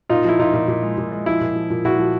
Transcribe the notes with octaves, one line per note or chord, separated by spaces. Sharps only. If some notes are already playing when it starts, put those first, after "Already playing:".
A#2 D#4 F4
F3 E4
A#2 D#4 F4
A#2
A#2
G#3
A#2
G#3
F3 E4
A#2
F3
A#2
A#2 E4 F#4
F3